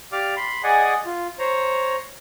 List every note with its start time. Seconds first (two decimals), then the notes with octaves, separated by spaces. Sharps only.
0.12 G4 D5 F5 D6 F6
0.36 B5 C6
0.64 G#4 D5 D#5 F#5 G#5
1.05 F4
1.39 C5 C#5 A#5